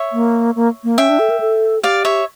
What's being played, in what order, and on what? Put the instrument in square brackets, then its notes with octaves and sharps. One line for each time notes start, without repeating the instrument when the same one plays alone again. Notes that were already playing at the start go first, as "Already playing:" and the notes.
Already playing: [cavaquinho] C#5 E5
[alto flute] A#3
A#3
A#3
[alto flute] C#4 [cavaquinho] E5 G5
[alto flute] D4
A4
A#4
A4
[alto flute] G4 [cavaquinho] D5 F5
[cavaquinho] C#5 E5